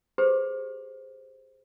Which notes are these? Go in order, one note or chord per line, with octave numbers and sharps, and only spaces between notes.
G4 G#4 B4 C5